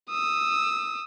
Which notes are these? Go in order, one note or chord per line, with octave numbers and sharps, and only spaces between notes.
D#6 E6